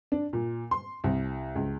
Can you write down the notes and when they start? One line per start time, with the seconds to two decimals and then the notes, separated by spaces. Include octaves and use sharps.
0.12 D4
0.33 A#2
0.71 C6
1.04 C2
1.55 C#2